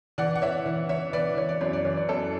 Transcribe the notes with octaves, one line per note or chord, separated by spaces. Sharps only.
E3 D5 F#5
F#5
E3 C#5 E5
E3
E3 C#5 E5
E3 B4 D5
E3 C#5
D5
F#2 C#5
D5
E3 C#5
D5
F#2 A4 C#5